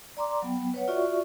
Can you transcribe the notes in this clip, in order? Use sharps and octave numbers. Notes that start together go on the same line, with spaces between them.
D5 A#5 C6 D6
F#3 B3 G5
B4 C#5 F#5
F4 F#4 D5 E5 C#6